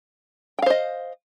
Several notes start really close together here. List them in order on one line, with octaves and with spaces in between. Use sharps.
G5 F5 C5 D#5